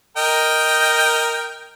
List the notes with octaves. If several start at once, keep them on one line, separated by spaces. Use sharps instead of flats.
A#4 D#5 G5